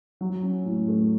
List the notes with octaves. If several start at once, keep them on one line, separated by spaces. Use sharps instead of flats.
F#3
C#4
A2
A3